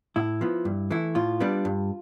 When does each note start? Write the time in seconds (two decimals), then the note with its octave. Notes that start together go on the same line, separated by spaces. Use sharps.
0.16 A2 E4
0.41 F3 B3
0.65 G2
0.91 E3 A3 E4
1.15 A2 F4
1.40 G3 B3 D4
1.65 G2